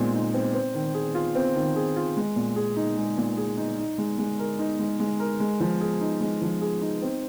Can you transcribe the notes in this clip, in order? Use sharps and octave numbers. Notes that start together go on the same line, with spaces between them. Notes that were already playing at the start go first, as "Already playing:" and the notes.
Already playing: A#2 G#3 C4 D#4
D#4
C4
C4
D#3
G#4
F4
C4
D#3
G#4
F4
G#3
A#2
G#4
D#4
G#3
A#2
G#4
D#4
D#4
G#3
G#3
A#4
D#4
G#3
G#3
A#4
G#3
F3
G#4
D#4
G#3
F3
G#4
D#4
C4